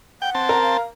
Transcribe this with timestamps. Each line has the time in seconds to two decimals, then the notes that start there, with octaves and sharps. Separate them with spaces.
0.22 F#5 G5
0.35 C4 A5
0.49 A#4
0.62 F5